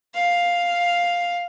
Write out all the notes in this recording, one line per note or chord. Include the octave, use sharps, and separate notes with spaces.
F5